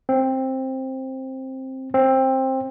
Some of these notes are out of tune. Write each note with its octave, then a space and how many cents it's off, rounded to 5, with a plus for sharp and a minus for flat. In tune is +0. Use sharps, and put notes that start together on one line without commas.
C4 +10
C4 +15